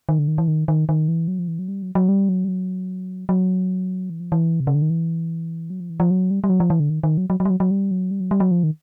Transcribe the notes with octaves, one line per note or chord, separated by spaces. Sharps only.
D#3
D3
D#3
E3
D#3
D#3
D#3
E3
F#3
F3
E3
F#3
G3
F#3
F#3
G3
F#3
G3
F#3
F#3
E3
F3
E3
C3
C#3
D3
D#3
E3
F#3
F3
E3
F3
F#3
G3
G3
F#3
F3
E3
D3
D#3
D#3
F#3
F#3
F#3
G3
F#3
F#3
G3
F#3
G3
F#3
G3
F#3
F3
D#3